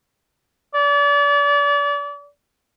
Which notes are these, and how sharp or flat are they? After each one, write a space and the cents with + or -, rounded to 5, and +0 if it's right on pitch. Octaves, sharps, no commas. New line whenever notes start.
D5 -35